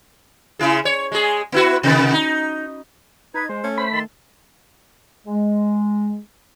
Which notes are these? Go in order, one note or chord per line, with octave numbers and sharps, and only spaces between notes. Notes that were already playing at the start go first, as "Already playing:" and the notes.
C#3 E4 G#4
C#5
G#3 G#4
B3 E4 F#4
C3 D#3 B3
D#4
D#4 B4 G#6
G#3 C5
A3 C#4
C5 B5
D#3 A5 C6
G#3